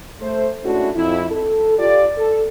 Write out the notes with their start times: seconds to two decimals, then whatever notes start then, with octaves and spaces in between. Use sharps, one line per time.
0.20 A3 C5
0.64 G#3 A3 C#4 D4 E4 F#4
0.95 F2 E4
1.31 A4
1.78 F4 G4 D5
2.18 A4